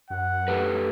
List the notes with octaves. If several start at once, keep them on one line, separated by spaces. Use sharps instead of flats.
F#2 F#5
A3 G4 B4